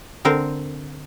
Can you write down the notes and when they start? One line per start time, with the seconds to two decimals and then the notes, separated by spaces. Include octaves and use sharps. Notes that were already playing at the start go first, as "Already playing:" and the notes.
0.25 D3 C4 A#4 C5